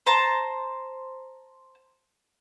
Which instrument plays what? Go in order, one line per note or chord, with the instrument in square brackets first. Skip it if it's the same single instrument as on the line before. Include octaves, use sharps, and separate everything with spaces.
[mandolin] C5 A5 A#5